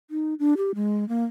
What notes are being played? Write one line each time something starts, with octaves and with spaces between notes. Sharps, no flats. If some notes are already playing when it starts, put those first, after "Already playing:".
D#4
D4
G4
G#3
A#3